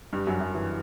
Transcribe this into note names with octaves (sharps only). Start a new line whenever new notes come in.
G2 G3
F#2 F#3
F#2 F#3
E3